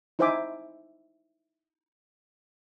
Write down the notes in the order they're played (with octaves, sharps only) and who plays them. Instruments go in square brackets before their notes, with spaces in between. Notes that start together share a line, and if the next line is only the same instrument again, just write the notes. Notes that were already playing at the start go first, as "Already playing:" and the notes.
[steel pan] D#4 E4 C5 E5 G#5 D6